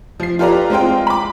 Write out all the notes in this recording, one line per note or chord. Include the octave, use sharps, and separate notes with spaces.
F3 C7
F4 G4 A4 B4 D5 A#5
G#3 C4 F4 G5
B5 D6